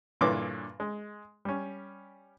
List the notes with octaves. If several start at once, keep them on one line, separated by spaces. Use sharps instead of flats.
G2 A#2 D3 E3 C#5 D6
G#3
G3 C#4